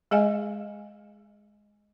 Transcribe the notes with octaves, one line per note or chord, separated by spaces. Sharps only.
G#3 G#4 D#5 F5 G#5